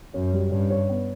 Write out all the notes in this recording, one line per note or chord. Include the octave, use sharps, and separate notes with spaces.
F#2 C#4
G3
G2 C#4
C#5
B3